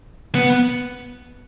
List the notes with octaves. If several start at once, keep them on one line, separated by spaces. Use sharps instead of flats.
B3